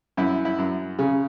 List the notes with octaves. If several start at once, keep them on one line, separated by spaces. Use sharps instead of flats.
F#2 E4
E4
F#2
C#3